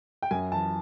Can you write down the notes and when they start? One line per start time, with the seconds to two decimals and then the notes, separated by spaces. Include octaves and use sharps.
0.22 G5
0.31 F#2 G#5
0.52 E3 A5